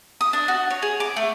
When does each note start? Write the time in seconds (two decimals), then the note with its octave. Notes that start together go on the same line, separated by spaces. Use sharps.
0.21 D#6
0.33 D4
0.48 F#4
0.70 C#5
0.82 G#4
1.00 D6
1.16 A3